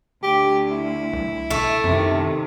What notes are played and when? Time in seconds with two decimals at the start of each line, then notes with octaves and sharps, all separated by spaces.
0.23 D2 G4
0.71 E4
1.13 C2
1.51 B1 A3
1.84 F#2 C3 D#3